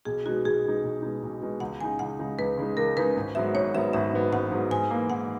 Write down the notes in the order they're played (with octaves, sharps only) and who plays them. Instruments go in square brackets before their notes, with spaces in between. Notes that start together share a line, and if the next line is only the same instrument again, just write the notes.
[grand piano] B1 [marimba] G#4
[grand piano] B2 G#3 D#4 [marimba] F#4
[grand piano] B1 [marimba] G#4
[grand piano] B2 G#3 D#4
B1
B2 G#3 D#4
B1
B2 G#3 D#4
[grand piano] C#2 [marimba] F#5
[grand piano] C#3 G#3 D#4 [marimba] G#5
[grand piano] C#2 [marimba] F#5
[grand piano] C#3 G#3 D#4
[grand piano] C#2 [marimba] B4
[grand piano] C#3 G#3 D#4
[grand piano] C#2 [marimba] A#4
[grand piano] C#3 G#3 D#4 [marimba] B4
[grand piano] G#1
[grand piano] G#2 F#3 B3 [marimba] E5
[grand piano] G#1 [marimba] C#5
[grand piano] G#2 F#3 B3 [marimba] E5
[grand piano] G#1 [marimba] E5
[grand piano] G#2 F#3 B3
[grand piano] G#1 [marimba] F#5
[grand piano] G#2 F#3 B3
[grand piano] G#2 [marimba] G#5
[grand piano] E3 A#3
[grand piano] G#2 [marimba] F#5